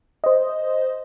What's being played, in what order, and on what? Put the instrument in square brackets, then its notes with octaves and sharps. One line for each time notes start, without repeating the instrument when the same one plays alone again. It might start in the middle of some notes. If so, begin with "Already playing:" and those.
[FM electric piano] C5 D#5